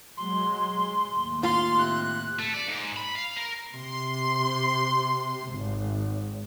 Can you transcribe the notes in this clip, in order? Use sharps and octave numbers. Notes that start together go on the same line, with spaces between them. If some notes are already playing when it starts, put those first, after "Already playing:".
F#3 G#3 C6
D#2 A2
F4 F5 C6
C3 F#6
A3
D5
G#2
B5
F5
A#4
C3 C6
G#1